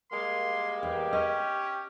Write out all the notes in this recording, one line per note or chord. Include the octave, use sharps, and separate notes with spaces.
G3 G#3 A#3 C6
E2 G4
C#4 D#5